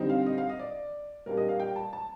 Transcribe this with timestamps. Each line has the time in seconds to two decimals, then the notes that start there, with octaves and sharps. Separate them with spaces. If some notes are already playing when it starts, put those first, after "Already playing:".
Already playing: D3 G3 C4 D#4
0.09 F5
0.26 D#5
0.38 F5
0.49 D#5
0.59 D5
1.26 A#2 G3 A#3 D4 A#4
1.37 D#5
1.49 F5
1.60 G5
1.76 A5
1.93 A5